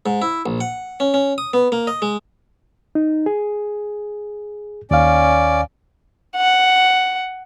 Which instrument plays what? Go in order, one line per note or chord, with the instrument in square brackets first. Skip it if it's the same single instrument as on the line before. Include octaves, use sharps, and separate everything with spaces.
[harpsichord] G#2
E4
A#1
F#5
C#4
C#4
D#6
B3
A#3
D#5
G#3
[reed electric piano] D#4
G#4
[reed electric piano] D#2 F5 [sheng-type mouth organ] C#4 D5
[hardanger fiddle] F#5